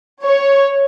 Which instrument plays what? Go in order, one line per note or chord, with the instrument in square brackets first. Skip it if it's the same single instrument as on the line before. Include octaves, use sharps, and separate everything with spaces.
[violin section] C#5